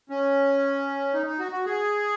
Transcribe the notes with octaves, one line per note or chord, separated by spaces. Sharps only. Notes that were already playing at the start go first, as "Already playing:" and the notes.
C#4
D#4
D#4
F#4
F#4
G#4